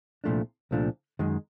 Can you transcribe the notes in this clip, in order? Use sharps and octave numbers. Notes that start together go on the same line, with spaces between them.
C2 A#2 F3 A3 D4
C2 A#2 F3 A3 D4
F#2 D#3 G#3